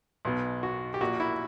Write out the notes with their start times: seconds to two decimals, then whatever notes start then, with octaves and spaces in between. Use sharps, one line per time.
0.25 B1 B2
0.63 F#4
0.94 G4
1.01 A#1 A#2 F#4
1.20 E4